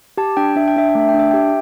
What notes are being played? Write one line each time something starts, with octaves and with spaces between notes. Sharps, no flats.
G4 A5
D4 G5
D4 E5
G5
D4 E5
G5
A3 E5
G5
D4
E5
G4 G5
E5